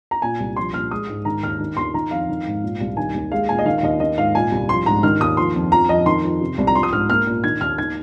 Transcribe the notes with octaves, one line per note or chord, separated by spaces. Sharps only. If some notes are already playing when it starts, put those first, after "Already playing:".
A#5
A#2 G#5
C2
F3 C6
A#2 F6
G#3 D#6
G#2
D#3 A#5
D#2 F6
D#3
D#2 C6
D#3 A#5
F2 F5
D#3
G#2
A#2
C2
D#3 G#5
D#2
G#3 F5
A#2 G#5
D#5
D#3 F5
F5
D#2 D#5
D#3 D#5
G#2 F5
A#2 G#5
C2
F3 C6
G#2 A#5
D#3 F6
D#2 D#6
F3 C6
F2
F3 A#5
F2 D#5
D#3 C6
F2
C3
C2
A#5
F3 C6
D#6
G#2 F6
A#3 F6
A#2
D#3 G#6
D#2 F6
D#3 G#6